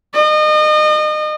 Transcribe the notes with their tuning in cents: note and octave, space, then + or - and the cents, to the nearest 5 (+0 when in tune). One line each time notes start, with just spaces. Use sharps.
D#5 -30